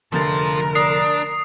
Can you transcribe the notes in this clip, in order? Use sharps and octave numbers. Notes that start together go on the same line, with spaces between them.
F1 D3 F3 A#4 A6
D4 D#6 C7